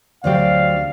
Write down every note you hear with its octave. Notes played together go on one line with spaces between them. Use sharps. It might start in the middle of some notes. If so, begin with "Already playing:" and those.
D2 D3 F#3 C4 G4 D5 F5